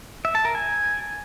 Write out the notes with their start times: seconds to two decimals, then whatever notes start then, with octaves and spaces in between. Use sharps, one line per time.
0.25 E5
0.35 A5
0.45 A#4
0.55 G#5